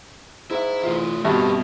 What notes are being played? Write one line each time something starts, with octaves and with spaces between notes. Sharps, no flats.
G#2 E4 E5
E3 A3 F4
G2 B2 A3 C4 F#4 G4